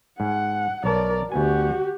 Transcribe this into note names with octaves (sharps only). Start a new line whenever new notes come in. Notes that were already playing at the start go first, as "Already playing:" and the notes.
G#2 F#5
B1 A#4 C#5 D5 A5
D2 B3 F#4 G4 G#5